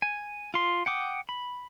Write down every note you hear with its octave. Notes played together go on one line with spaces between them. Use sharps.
G#5
F4 C6
F#5 G5 D6 D#6
B5